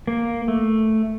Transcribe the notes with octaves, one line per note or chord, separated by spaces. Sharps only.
A#3
A3